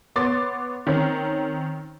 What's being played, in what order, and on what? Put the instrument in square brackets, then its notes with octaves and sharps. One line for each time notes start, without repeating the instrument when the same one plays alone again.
[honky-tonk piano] B3 C#5 C6 D6 A6
D#3 C4 C#4